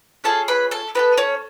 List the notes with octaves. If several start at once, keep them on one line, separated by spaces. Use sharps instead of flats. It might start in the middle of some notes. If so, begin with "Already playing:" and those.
C#4 F4 G#4 A4 A5
B4 B5
A4 A5
B3 F#4 A4 B4
C#4 C#5